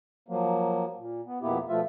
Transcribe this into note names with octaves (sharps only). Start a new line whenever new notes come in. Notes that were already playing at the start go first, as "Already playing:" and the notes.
F3 F#3 A#3
A#2
B3
F2 B2 A#3 B3 E4 G4
B2 F3 A3 F4 E5